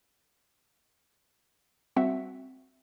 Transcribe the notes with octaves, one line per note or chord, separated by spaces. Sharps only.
G3 C4 F#4 E5 F#5